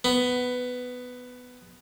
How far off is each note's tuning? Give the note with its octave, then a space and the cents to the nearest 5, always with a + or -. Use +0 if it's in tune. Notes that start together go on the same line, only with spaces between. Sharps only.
B3 +10